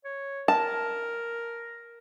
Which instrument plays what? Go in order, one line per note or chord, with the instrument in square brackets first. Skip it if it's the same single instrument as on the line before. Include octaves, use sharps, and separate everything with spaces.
[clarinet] C#5
[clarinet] A#4 [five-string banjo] A5